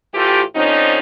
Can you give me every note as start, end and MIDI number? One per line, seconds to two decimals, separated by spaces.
0.14 0.41 45
0.14 0.41 52
0.14 0.41 57
0.14 0.41 65
0.14 0.41 67
0.55 0.99 50
0.55 0.99 53
0.55 0.99 60
0.55 0.99 61
0.55 0.99 63